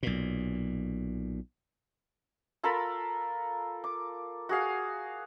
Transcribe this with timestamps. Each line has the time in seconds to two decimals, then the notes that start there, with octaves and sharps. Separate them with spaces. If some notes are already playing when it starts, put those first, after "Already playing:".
0.03 B1 A#2
2.64 F4 A4 A#4 B5
3.84 D6
4.49 F#4 G#4 F5